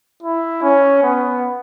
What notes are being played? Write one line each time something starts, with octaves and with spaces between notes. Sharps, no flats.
E4
C#4
B3